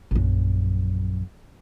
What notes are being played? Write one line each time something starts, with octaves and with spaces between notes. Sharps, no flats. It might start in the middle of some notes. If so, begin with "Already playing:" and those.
A#1 F#2